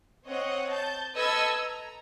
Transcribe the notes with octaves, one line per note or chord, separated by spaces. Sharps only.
C4 C#5 D#5 F#5
A5 G6
A4 B4 D#5 E6 G#6
A#5